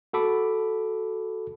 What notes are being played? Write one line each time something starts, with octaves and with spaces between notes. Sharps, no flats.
F#4 A4 B5 D6